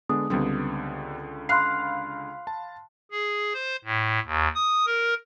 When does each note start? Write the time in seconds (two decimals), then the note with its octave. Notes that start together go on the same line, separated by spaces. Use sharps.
0.09 D3 G#3 B3 D4 D#6
0.30 C#2 D3 G3 B3 C4
1.49 F5 B5 C6 F6 F#6 C7
2.47 A5
3.11 G#4
3.54 C5
3.84 A2
4.25 D#2
4.55 D#6
4.86 A#4